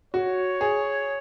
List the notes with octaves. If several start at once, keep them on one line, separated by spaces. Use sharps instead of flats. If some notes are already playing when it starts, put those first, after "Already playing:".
F#4 C#5
G#4